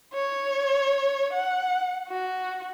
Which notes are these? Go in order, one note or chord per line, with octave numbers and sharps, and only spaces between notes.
C#5
F#5
F#4